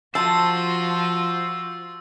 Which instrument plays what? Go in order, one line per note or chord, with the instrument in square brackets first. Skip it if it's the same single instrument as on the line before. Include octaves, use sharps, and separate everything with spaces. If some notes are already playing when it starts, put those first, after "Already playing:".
[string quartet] F3 F4 F#4 [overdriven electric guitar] C5 [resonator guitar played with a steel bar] A5 [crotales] E6